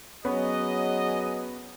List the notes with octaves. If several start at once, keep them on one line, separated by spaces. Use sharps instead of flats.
F#3 B3 C#4 G#4 B4 D#5